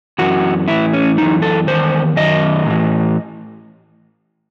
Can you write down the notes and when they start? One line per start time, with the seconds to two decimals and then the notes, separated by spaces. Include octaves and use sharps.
0.19 F#2 E3 F#4
0.68 A2 E3 E4
0.93 C#4
1.17 F#2 E3 D#4
1.42 A4
1.67 E2 D#3 C5
2.16 F#2 D#3 D#5
2.66 A2 E3